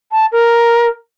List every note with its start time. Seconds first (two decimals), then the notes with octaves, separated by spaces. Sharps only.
0.12 A5
0.32 A#4